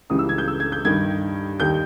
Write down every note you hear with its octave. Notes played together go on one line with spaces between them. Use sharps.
C#2 C#3 E3 G3 D#6
E6
G#6
G6
E6
G#6
G6
G2 D#3 G3 G#6
D#2 D#3 G3 G6